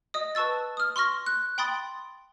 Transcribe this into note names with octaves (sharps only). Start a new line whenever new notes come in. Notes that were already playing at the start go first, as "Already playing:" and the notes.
D#5 D#6
B4 A5 C#6 E6 A6
D#6 F6
C6 C#6 F6 A#6
F#6
G5 B5 C6 D#6 A6